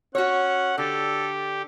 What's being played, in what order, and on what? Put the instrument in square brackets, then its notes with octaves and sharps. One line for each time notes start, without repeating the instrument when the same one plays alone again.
[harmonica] C#4 [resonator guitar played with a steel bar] F#4 C#5 [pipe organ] F#5
[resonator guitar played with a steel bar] D3 [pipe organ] G4 [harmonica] A4